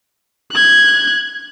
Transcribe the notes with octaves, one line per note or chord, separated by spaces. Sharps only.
F#6 G#6